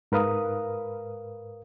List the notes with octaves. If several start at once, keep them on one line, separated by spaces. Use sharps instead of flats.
G#2 A#4 B4 F5 D#6